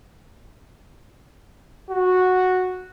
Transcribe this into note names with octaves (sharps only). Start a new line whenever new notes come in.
F#4